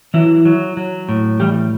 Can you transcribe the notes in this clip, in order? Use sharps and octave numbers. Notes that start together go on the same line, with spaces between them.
E3 F#3 E4
F#3
F#3
A2
E3 G3 G4